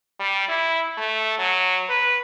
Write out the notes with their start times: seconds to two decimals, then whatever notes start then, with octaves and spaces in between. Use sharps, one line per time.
0.20 G3
0.48 E4
0.97 A3
1.39 F#3
1.89 B4